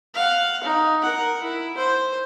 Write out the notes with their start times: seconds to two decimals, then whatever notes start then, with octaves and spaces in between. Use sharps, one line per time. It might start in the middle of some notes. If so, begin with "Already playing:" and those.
0.14 F5 F#5
0.63 D#4
1.02 A#4 F#5
1.42 E4
1.77 C5